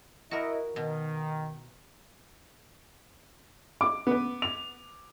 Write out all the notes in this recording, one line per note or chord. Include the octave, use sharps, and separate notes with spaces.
E4 F#4 A#4 D#5
B2 D#3
D6
B3 B4
F7